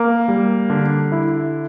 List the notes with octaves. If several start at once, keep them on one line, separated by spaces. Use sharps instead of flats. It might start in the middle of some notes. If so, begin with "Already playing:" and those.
Already playing: A#3
G3
D3
E4